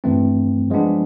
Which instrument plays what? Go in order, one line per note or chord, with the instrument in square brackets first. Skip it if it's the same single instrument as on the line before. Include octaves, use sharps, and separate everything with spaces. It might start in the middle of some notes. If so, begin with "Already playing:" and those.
[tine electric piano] G2 E3 A3 C4
F3 G#3 B3 D4